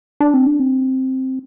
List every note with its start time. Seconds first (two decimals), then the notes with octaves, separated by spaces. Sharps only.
0.20 D4
0.34 C4
0.47 D4
0.60 C4